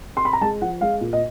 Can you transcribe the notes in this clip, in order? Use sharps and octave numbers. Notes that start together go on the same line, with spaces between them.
C6
B5
A#5
G#3 A5
F3 F#5
G#3 F5
A#2
D#5